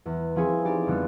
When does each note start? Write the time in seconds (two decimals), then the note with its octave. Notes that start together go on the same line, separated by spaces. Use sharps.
0.06 E2
0.36 F3 C4 E4 G#4 C#5
0.65 D#4 G4 D5
0.87 F2 D3 G3 B3